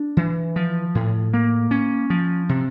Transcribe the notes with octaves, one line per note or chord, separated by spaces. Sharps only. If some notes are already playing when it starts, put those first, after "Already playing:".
Already playing: D4
E3
F3
A2
A#3
C#4
F3
C3